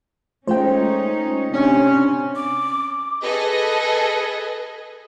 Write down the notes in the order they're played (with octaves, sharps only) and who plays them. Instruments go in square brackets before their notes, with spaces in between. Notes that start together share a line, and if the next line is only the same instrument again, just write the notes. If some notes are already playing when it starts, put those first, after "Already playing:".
[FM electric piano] G#3 F4 C5 [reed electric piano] A3 G5 [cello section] C#4 D#4
[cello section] C3 [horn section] C#4 [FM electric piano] D4
[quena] D6
[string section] G#4 A4 B4 D#5